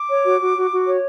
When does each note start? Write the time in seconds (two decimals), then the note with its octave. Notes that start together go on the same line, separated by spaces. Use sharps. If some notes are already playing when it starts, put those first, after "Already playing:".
Already playing: D6
0.09 C#5
0.24 F#4
0.40 F#4
0.56 F#4
0.71 F#4
0.87 C#5